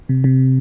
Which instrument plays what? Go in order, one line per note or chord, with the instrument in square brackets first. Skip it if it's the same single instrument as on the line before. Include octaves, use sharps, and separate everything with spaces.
[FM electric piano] C3
C3